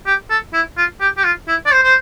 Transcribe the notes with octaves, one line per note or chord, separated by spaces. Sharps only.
G4
A4
E4
F4
G4
G4
F4
E4
D5
C5
C5